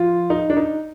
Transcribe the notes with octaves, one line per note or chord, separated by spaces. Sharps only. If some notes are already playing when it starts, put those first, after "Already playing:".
Already playing: F3 F4
D#4
D4
D#4